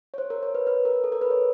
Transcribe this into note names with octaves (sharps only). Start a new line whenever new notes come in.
C#5
C5
A#4
C#5
B4
B4
A#4
A4
A#4
B4
C#5